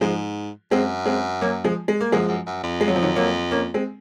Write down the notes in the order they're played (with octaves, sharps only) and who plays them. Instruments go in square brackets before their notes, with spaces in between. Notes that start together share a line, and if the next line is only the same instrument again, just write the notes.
[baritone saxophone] G#2 [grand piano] F3 G#3
[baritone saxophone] F#2 [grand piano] G#3 C4
[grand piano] G#3 C4
F#3 A#3
F3 G#3
G#3
A#3
[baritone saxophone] F#2 [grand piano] F3 G#3
[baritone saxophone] F#2
F#2
F2
[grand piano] G#3
F#3
F3
D#3 F#3
F#3 A#3
A#3 C#4
G#3 C4